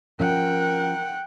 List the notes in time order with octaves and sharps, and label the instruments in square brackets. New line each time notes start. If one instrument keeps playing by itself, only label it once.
[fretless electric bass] F3 C#4 [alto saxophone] A#4 [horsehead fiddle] F#5 G5